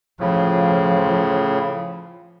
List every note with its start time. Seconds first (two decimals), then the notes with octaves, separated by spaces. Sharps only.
0.20 A2 C#3 F3